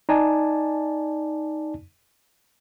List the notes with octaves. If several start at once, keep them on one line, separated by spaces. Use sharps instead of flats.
D#4 D5 G#5 A5